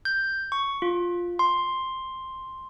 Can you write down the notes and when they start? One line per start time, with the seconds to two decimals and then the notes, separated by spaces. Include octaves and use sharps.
0.05 G6
0.52 C#6
0.82 F4
1.39 C6